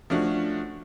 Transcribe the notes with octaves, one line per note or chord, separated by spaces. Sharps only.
F3 A3 C#4 D4 F#4